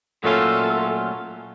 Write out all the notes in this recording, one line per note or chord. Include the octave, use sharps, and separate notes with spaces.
A#2 F#3 A3 C#4 F4 A4